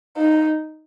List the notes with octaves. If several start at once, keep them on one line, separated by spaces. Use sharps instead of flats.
D#4